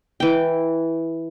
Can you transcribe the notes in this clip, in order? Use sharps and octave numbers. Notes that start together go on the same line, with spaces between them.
E3 G5